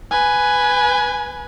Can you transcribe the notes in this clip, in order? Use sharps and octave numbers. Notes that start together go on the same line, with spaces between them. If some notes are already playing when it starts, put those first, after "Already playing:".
B4 G#5